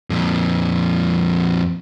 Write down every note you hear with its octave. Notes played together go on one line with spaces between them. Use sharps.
F2 A#2